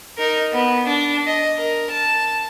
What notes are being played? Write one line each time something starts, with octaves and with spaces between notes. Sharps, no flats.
D#4 A#4
B3
D4
D#5
A#4
A5